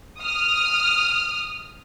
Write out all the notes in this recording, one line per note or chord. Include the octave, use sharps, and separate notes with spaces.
D#6 F6